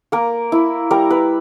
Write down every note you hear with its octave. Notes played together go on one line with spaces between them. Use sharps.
A#3 A#4
E4
G3 A#4
B4